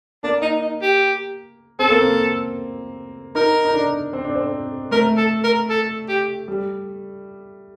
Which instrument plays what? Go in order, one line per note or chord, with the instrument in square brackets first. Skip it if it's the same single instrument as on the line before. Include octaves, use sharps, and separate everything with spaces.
[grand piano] A#3 [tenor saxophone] D4
[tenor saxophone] D#4
D#4
G4
[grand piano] C4 [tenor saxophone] A4
[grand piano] A#3
C4
[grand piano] D#4 [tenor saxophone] A#4
[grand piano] D#4
D4
C4
D4
C4
[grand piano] A3 [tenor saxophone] A#4
[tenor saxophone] A4
A#4
A4
G4
[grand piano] G3